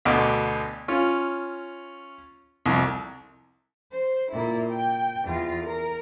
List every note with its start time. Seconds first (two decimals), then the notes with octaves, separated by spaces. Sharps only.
0.05 D2 B2 D3
0.88 C#4 F4
2.66 C2 F2
3.92 C5
4.32 A#2 E4
4.70 G5
5.25 E2 F4
5.65 A#4